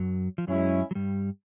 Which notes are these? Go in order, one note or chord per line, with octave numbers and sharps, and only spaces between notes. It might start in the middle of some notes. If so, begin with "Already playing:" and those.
Already playing: F#2 F#3
F3
F#2 F#3 G#3 C#4 E4
F#3
G2 G3